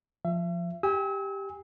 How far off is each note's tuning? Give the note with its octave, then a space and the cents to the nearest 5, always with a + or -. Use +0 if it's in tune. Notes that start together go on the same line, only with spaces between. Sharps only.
F3 +0 E5 +40
G4 +0 G#5 -20 E6 -45